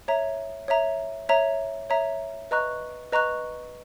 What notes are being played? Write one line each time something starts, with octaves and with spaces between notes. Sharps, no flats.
C#5 E5 A#5
C#5 E5 A#5
C#5 E5 A#5
C#5 E5 A#5
B4 D#5 A#5 C#6 F#6
B4 D#5 A#5 C#6 F#6